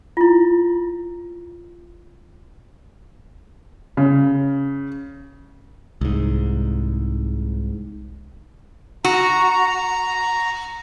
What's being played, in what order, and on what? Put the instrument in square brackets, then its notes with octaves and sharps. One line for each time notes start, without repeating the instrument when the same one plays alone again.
[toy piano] E4 F4
[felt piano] C#3
[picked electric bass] C2 G#2
[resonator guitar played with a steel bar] F#4 [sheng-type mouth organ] A#5